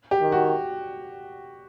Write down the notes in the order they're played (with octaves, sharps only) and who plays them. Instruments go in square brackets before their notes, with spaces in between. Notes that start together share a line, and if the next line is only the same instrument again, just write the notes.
[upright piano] G4
[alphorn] D#3
[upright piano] F#4